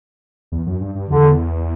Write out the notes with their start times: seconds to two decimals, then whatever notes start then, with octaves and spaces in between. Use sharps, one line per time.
0.52 E2
0.66 F#2
0.81 G2
0.95 G2
1.10 E2 D3